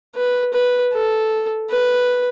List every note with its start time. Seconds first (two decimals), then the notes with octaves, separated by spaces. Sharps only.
0.16 B4
0.54 B4
0.93 A4
1.70 B4